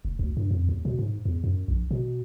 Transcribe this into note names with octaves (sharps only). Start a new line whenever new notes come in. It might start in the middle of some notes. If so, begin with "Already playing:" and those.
F1
D2
G2
F2
D#2
B2
G#2
E2
F#2
A#1
B2